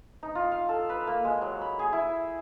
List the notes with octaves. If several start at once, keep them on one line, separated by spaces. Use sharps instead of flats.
D#4
F4
F5
A4
B4
A#3
G#3
F#3
B5
G#4
E4